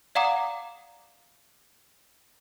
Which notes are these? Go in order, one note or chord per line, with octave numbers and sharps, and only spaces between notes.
D5 F5 F#5 A#5 D6 D#6